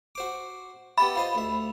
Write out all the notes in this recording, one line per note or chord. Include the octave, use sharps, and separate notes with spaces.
F#4 C5 D6
B3 G4 E5 B5
F4 C5 D#5
D2 E5